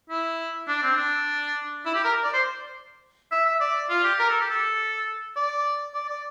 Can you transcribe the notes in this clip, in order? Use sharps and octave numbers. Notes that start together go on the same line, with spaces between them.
E4
D4
C4
D4
E4
G4
A#4
D5
C5
E5
E5
D5
F4
G4
A#4
A4
G4
A4
D5
D5
D5